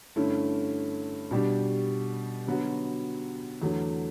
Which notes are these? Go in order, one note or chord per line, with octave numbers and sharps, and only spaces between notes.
G2 D3 A3 C#4 E4
B2 G3 D4 G4
D3 F#3 B3 F#4
E2 D3 F#3 A3